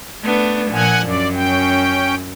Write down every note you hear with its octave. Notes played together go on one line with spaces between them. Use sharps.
A3 B3 D4
A#2 F3 F#5 G#5
F#2 D5
C#4 G5